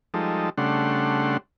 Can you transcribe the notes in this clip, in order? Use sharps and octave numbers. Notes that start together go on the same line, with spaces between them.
F3 G3 G#3 D#4 A4
C#3 G3 A3 D4 F#5 C6